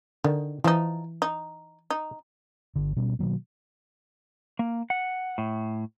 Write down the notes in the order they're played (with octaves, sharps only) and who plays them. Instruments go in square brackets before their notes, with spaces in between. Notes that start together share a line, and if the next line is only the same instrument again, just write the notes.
[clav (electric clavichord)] D3 [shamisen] D#3
[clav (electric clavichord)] E3 [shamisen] F3 D#4
[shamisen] D#4
D#4
[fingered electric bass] G1 D3
B2 G3 C#4
B2 D#3 F#3 A#3
[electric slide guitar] A#3
F#5
A2